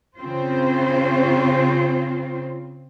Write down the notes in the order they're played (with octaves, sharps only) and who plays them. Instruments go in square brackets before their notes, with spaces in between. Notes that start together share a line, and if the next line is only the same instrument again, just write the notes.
[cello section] C#3 C4 F4 C5